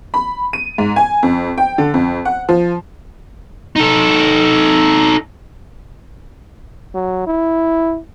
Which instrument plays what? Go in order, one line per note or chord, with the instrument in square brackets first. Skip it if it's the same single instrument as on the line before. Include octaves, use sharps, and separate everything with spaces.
[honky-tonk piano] B5
D#7
G#2
G#5
F2
G5
D3
F2
F#5
F3
[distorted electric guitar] D#4 A4
[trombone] F#3
E4